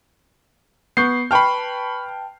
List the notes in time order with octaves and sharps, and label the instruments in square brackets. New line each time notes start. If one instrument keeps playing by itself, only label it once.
[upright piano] B3 [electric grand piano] C#6 G6 C7
[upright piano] B4 G5 A5 [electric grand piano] B5 C#6 F6